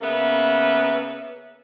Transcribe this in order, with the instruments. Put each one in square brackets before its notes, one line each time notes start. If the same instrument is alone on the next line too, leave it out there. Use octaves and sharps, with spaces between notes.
[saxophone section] C#3 A#3 B3 B4 E5